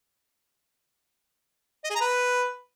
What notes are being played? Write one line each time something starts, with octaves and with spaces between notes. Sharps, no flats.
D#5
G#4
A#5
B4